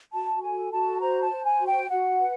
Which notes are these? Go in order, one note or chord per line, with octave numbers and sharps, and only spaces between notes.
F#4 A5
A4 G#5
F#4 A5
C5 A#5
A5
C5
G#5
F#4
G5
F#4 F#5
B4